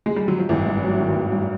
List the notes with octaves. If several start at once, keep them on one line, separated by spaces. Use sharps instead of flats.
G#3
G3
F#3
F3
G#1 E3
G2
F#3
D#3
G#1
G2